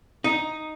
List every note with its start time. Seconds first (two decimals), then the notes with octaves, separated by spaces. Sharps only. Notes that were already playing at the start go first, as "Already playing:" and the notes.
0.24 D#4